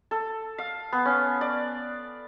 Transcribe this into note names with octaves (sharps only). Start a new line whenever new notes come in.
A4
F5
B3
C#4
D5